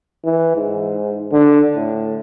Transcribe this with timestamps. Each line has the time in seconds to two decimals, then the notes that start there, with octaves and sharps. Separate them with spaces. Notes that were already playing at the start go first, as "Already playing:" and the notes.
0.25 E3
0.56 G#2
1.32 D3
1.76 A2